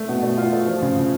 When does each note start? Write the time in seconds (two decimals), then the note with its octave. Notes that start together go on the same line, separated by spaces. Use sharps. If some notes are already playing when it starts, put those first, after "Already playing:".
Already playing: A3
0.09 B2
0.23 A3
0.37 F4
0.53 A3
0.67 F3
0.82 C#3
0.96 C#3